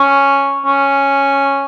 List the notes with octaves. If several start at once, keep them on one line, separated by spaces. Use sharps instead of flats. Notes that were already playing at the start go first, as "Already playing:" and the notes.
Already playing: C#4
C#4